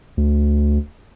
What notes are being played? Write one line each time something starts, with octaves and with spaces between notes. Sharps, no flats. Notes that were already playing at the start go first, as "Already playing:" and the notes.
D2